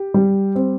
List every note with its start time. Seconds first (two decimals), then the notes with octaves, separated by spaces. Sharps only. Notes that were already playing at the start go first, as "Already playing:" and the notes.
Already playing: G4
0.14 G3
0.55 C4